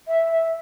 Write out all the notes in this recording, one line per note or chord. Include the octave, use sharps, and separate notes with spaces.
E5